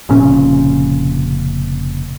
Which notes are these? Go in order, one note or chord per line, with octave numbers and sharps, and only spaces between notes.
F1 A#2 C#3 C#4